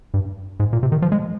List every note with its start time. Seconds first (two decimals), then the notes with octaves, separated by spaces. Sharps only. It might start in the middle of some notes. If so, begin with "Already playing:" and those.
0.14 G2
0.60 G#2
0.73 A#2
0.83 C3
0.92 D#3
1.02 F3
1.12 G#3